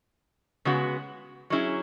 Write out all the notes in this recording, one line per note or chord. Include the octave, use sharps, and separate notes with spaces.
C#3 G#3 B3 F#4
F#3 C#4 E4 G#4